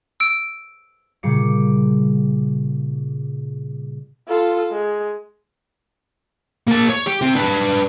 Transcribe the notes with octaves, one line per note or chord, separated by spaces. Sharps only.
E6 D7
A#2 C#3 G3 D6 C7 C#7
F4 A4
G#3
A#3 A5
C#5
G4
C4 G4
D4 B4